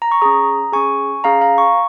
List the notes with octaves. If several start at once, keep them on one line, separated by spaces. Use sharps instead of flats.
A#5
C#6
C#4 G#4 A#5 D#6
C#4 G#4 G#5 C#6
C#4 G#4 F5 A#5
F5 A#5
G#5 C#6